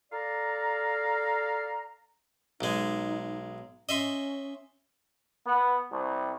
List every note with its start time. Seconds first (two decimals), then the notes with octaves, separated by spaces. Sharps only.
0.12 A4 D5 F5 A#5
2.61 B1 G#3 D#4
3.89 C#4 D#5 E5 C6
5.46 B3
5.91 C2